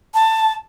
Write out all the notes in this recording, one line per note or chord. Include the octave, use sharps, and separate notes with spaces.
A5